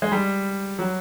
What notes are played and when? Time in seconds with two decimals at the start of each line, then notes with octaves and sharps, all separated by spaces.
0.02 G#3
0.12 G3
0.79 F#3